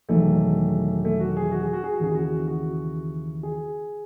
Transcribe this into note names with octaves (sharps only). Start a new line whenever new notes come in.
E1 E2 D#3 F#3 A3
A3
F#4
G#4
F#4
G#4
F#4
G#4
F#4
D#2 C#3 E3 G#4
F#4
F#4
G#4